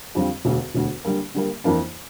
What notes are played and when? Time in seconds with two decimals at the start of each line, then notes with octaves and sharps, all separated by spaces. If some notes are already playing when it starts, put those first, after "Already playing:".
0.15 F2 D3 G3 C4 F4
0.45 E1 D2 D3
0.74 E1 D2 D3
1.05 D3 G3 A#3
1.35 D3 G3 A#3
1.64 F2 E3 A#3 D4